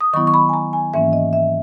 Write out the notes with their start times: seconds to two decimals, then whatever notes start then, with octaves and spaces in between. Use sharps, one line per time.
0.01 D#6
0.13 D#3 F#3 B3 E4 C#6
0.27 C#6
0.34 B5
0.49 G#5
0.54 A#5
0.73 G#5
0.94 G#2 E3 A#3 C#4 E5
1.13 D#5
1.33 E5